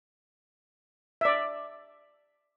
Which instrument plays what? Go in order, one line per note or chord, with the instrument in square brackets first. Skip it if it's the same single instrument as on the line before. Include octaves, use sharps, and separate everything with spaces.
[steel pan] D5 E5